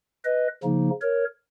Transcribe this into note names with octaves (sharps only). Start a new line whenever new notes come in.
B4 D#5
C#3 F3 A#3 D#4
A#4 C#5